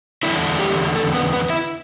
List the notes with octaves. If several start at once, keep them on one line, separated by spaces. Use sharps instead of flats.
E2 D3 A3 D4 E4 E5
G4
A3 A4
B3 B4
B3 B4
E4 E5